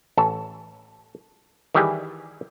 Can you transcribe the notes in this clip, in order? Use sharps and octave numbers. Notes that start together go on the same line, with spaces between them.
A1 A4 A5
D#3 E3 G3 E4 G4 G#4